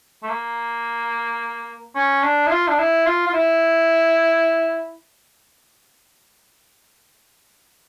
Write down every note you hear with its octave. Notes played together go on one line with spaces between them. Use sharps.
A3
A#3
C#4
D4
E4
F4
D4
E4
F4
F4
E4